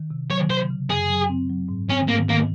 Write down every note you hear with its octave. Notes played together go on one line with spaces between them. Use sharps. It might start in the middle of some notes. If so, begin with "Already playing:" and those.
Already playing: D#3
C3
F#3 C#5
C3 C5
C#3
F#2 G#4
F#3
C4
F#3
G#2
C4 C#4
G#2 A#3
D#3 A#3